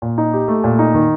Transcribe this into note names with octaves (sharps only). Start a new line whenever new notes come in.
A#2
D#4
G4
A3
A#2
D#4
D#3